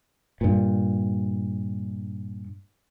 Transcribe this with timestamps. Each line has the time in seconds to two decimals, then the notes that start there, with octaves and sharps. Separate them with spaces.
0.41 G2 A#2